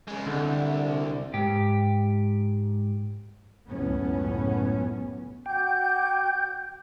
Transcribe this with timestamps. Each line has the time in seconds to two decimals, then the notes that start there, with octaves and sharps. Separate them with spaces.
0.08 C#3 G#3
0.26 C2 D3
1.34 G#2 G4
3.67 C#2 F#2 A2 B3 C#4
5.46 F#4 G5 D6 G6